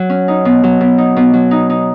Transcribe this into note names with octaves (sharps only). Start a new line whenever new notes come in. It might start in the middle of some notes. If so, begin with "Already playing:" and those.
Already playing: F#3
C#4
D#4
B2
F#3
B2
D#4
B2
F#3
D#4
D#4